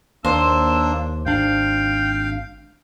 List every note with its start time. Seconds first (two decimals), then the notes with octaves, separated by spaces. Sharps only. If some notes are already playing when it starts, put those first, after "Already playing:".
0.25 D#2 A#3 D4 C5 E6
1.26 G#1 D4 F5 G5